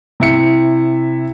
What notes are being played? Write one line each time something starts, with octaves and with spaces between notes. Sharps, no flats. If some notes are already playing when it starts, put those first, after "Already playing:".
C3 E4 C#7